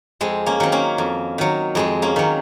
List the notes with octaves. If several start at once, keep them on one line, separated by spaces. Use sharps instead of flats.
F2 G#3 C4
A#3 C#4
D#3 F#3 C4
A#3 C#4
F2
D#3 F#3
F2 G#3 C4
A#3 C#4
D#3 F#3